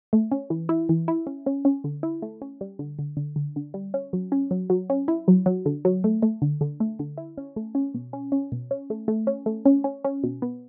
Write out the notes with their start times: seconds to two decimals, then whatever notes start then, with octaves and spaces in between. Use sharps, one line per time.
0.13 A3
0.31 C#4
0.50 E3
0.69 E4
0.89 E3
1.08 E4
1.27 C#4
1.46 C#4
1.65 C#4
1.84 D3
2.03 E4
2.22 A3
2.42 C#4
2.61 G3
2.79 D3
2.99 D3
3.17 D3
3.36 D3
3.56 D3
3.74 G3
3.94 C#4
4.13 F#3
4.32 C#4
4.51 F#3
4.70 F#3
4.90 C#4
5.08 E4
5.28 F#3
5.46 F#3
5.66 D3
5.85 F#3
6.04 A3
6.22 A3
6.42 D3
6.61 D3
6.80 A3
6.99 D3
7.18 E4
7.38 C#4
7.56 A3
7.75 C#4
7.94 B2
8.13 C#4
8.32 C#4
8.52 B2
8.71 C#4
8.90 A3
9.08 A3
9.27 C#4
9.46 A3
9.65 C#4
9.84 C#4
10.05 C#4
10.24 B2
10.42 B3